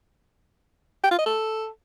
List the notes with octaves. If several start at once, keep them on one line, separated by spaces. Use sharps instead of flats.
G5
F4
D#5
A4